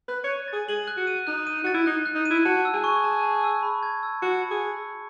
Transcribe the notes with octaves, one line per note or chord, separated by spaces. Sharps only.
B4 F#6
C#5 D#7
G#4 A6
G#4 F#7
F#6
F#4
D#7
D#4 F#6
D#7
F#4 A6
E4
D#4 F#6
F#6
D#4
E4 D#7
F#4 A5
E6
G#4
C#6
A5
A5
E6
B5
G#6
E6
F#4 C#7
B5
G#4
G#6
E6